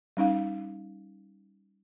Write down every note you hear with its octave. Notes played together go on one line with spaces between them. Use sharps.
G3 C#4 D#4 F5